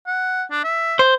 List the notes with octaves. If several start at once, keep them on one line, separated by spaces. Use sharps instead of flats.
F#5
D4
E5
C5